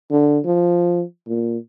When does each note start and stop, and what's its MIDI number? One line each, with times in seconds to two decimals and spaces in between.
0.11 0.39 50
0.45 1.03 53
1.27 1.57 46